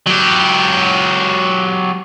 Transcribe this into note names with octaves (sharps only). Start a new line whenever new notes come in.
F#3 G4